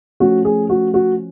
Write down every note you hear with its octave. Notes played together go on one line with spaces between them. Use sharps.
F3 A3 C#4 F#4
G#4
F#4
F#4